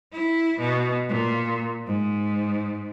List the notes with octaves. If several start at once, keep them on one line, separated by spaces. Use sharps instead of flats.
E4
B2
A#2
G#2